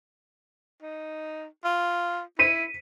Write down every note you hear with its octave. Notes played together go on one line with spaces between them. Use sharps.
D#4
F4
E4 B6 C#7 D#7